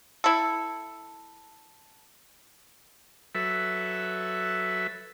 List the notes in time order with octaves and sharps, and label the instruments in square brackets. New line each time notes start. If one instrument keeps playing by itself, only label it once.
[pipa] E4 A4
[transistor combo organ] F#3 A4 B4 E5